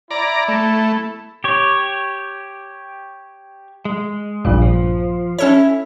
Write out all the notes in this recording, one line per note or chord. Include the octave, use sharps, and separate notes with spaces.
E4 D5 A#5
A3
G4 C#5
G#3
A#1 G2 A#2
F3
C#4 E4 A4 C#5